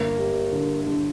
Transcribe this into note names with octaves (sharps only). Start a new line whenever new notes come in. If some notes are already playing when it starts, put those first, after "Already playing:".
Already playing: G1 A#3
G3
D3
D3